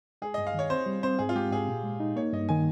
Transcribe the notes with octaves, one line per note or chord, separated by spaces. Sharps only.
G#3 G#4
G2 D#5
F5
D#3 C#5
C4 C5
G3
C4 C5
G#2 G#4
F4
G#3 G4
G#2 G#4
A#2
G#3
D#4
A#3 C#5
G2 D#5
D#3 G#5